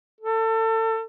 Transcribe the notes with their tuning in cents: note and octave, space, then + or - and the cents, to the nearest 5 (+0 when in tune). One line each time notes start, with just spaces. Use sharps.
A4 +30